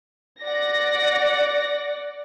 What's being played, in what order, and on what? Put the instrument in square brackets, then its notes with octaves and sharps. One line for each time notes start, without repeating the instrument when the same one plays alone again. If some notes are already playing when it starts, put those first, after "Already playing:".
[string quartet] D5 F#5 [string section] A#6